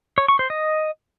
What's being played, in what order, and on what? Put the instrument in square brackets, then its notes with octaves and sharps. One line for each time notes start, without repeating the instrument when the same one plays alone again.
[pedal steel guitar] C#5
C#6
C5
D#5